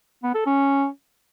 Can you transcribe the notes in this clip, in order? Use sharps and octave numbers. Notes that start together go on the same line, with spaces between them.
B3
A4
C#4